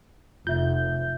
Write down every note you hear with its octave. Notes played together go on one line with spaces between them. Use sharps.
F1 F4 E5 G6